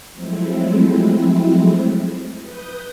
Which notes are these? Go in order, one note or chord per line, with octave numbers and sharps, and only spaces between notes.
F3 F#3 G#3 A3 C4 E4
B4 D#6 G6